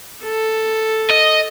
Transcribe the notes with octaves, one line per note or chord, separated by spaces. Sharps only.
A4
D#5